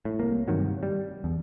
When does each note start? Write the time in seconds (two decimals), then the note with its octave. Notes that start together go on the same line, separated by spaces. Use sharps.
0.05 A2
0.19 C2 A#3
0.48 G2 C3 D#3 F#3
0.83 G3
1.24 E2